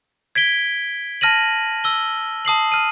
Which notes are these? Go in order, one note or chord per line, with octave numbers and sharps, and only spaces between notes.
G#6 B6 D7 G7
A5 F6 A#6 D#7 F#7
E6 G7
A5 D#6 C7 F#7
F6 D#7